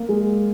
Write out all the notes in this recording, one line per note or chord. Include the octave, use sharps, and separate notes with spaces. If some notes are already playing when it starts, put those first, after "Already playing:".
Already playing: A#3
G#3